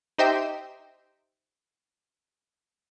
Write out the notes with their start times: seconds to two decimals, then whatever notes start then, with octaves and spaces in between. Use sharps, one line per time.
0.18 D#4 G4 C5 D#5 E5 G5